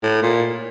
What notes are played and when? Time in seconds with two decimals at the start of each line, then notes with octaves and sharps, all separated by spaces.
0.03 A2
0.22 A#2